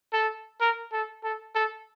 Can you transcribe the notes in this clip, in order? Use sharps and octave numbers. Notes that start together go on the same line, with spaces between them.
A4
A#4
A4
A4
A4